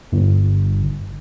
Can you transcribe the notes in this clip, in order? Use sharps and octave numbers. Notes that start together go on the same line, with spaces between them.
G1